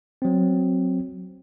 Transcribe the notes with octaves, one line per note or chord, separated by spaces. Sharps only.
F#3 C4